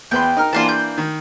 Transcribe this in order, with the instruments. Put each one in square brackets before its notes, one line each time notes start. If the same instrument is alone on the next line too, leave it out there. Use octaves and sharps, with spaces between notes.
[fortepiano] E2 B4 C6 [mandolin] G5
[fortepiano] D#4 A#4 F6
[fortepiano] E3 A#3 D4 [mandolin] F4 C5 A5
[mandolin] G6
[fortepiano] D#3